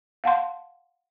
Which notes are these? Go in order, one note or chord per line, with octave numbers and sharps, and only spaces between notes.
F5 F#5 A5 C6